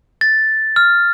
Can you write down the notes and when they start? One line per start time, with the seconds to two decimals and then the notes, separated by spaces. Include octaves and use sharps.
0.21 A6
0.76 F6